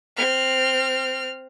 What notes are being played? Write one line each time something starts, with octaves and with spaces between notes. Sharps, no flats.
C4 F6